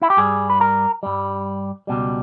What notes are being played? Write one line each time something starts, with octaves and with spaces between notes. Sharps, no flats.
E4
G4
G2 G3 G#4
B4
A#4
G2 G3
C#2 B2 G3